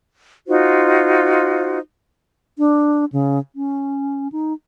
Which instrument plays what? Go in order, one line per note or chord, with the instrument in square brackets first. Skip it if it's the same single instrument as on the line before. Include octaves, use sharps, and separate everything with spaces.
[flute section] D#4 F4 F#4 C5
[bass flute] D4
C#3
C#4
D#4